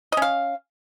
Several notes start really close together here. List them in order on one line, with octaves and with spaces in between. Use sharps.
D#5 C#4 F5